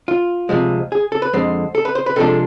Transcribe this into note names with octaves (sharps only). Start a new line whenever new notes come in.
F4
D2 C3 F3 G#3
G#4
A4
B4
F2 D3 G#3 C5
A4
B4
C5
B4
C3 F3 G#3 D4 A4